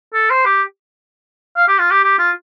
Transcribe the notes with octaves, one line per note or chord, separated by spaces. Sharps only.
A4
C5
G4
F5
G4
F4
G4
G4
F4